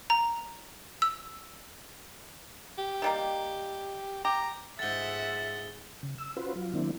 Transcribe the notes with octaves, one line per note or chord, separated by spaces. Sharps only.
A#5
E6
G4
D#3 G3 A#3
G4 A#5
G#2 F4 A4 E5 F#5 A6 G7
C#3
E6
C#4 F4 F#4 B4 C5
F#3 F4
D#3 F#3 A#3 C4 D4 E4